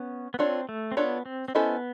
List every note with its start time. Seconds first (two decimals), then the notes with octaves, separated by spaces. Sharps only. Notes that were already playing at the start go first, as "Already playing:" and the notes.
Already playing: B3 C#4
0.34 B3
0.39 C4 D4 F4 A4 C#5
0.69 A3
0.92 C4
0.97 B3 D4 F4 A4 C#5
1.26 C4
1.48 C4
1.55 B3 C#4 E4 A4 C5 D#5